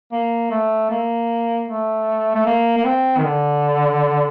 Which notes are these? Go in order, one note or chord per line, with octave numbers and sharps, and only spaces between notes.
A#3
A3
A#3
A3
A3
A#3
A#3
C4
D#3
D3